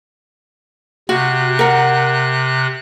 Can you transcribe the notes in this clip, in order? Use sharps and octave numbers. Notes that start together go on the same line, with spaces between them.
C3 F#4 F#6
A#4 F#5